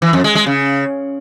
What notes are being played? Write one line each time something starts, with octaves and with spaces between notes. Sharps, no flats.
E3
F2
G#3
G#3
C#3